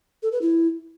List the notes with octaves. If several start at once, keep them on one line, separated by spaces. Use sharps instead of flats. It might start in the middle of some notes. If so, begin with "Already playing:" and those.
A4
B4
E4